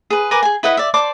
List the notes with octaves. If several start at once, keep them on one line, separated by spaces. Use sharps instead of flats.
G#4 B4
A#4 B4 G#5 D6
G#4 G#5
E4 B4 D#5 F#5
D5 E5
C5 D5 A5 D6